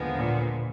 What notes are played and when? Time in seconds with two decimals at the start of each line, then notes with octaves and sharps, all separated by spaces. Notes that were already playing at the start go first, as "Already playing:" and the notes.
Already playing: D#2 D3 F3 G#3 B3
0.15 A#2